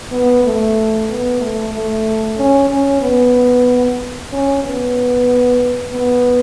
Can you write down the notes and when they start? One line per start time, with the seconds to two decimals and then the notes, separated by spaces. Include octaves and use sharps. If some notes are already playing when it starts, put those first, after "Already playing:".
0.12 B3
0.45 A3
1.09 B3
1.41 A3
1.73 A3
2.38 C#4
2.70 C#4
3.02 B3
4.31 C#4
4.64 B3
5.93 B3